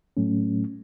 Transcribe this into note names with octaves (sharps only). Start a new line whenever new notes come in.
A2 F#3 A3 C#4